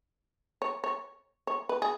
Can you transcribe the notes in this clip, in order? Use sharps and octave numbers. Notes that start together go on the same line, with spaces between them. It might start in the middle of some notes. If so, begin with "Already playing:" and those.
C#5
C#5
C#5
B4
G#4